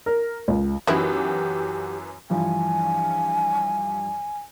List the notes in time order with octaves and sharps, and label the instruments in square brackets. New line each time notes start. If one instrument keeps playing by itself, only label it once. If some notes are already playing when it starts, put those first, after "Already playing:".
[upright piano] A#4
C#2
[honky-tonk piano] F#2 E3 F#4 [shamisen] D#3 B3 E4 [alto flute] G4
[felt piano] G2 E3 F3 [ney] G#5